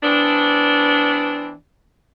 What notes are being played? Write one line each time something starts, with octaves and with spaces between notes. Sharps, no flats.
E3 B3 C4 D4